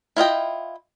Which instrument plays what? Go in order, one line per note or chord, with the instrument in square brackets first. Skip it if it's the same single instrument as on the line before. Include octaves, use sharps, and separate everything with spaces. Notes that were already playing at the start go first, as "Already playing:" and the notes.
[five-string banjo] E4 F4 D#5 G5